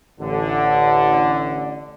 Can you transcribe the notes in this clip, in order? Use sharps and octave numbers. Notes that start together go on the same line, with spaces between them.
A1 D3